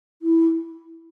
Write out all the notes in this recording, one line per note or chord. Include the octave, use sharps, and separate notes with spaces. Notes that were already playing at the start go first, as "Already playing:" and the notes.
E4